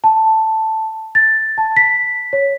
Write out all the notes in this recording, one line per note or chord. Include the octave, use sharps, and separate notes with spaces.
A5
A6
A5
B6
C#5